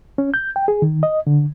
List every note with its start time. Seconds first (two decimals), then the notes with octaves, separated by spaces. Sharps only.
0.18 C#4
0.34 G6
0.56 G5
0.68 G#4
0.82 D#3
1.03 D#5
1.27 D3